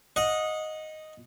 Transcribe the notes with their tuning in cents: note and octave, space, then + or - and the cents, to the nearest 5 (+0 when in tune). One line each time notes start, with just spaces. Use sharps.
D#5 +0 F#5 -30